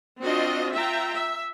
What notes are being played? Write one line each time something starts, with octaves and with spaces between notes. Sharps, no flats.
C4 D4 F4 F#4 D#5
F4 E5 G5 A#5
E5